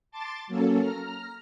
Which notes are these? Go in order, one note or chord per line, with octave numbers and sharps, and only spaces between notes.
A5 C6 D6 A6
F#3 A#3 C#4 A4
A#5 F6